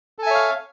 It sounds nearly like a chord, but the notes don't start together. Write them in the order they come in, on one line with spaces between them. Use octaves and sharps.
A4 G#5 E5 C#5 F5